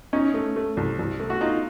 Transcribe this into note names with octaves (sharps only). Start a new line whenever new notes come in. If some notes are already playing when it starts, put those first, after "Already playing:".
C#4 D#4
A3
A3
C2
C2
A3
F#4
D#4 F4